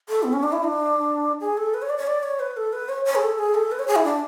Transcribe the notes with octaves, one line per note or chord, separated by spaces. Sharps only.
A4
B3
C#4
D4
E4
D4
G#4
A4
B4
C#5
D5
C#5
D5
C#5
B4
A4
B4
C#5
C#5
G#4
A4
G#4
A4
B4
C#5
G#4
E4
D4